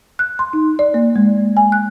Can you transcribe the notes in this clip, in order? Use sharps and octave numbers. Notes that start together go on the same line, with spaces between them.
F#6
C6
D#4
D5
A#3
G#3
G#5
F#6